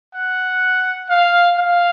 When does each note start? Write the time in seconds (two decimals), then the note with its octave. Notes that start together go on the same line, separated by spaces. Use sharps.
0.15 F#5
1.10 F5
1.58 F5